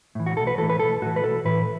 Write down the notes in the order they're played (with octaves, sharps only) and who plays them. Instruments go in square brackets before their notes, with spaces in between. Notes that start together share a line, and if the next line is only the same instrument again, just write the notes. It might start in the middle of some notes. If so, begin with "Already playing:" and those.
[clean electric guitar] A2 E3
F#4
B1 A4
B4
E3 A4
A2
B4
B1 A4
A2 E3 F#4
B4
B1 A4
A2 E3 B4